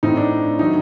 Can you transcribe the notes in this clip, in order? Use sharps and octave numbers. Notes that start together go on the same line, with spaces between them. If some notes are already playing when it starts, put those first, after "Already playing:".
A2 A3 C4 D#4
D4
D#3 F#3 A3 D#4